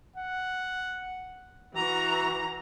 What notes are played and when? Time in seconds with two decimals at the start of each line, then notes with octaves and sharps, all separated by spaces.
0.16 F#5
1.76 E3 F#4 A#5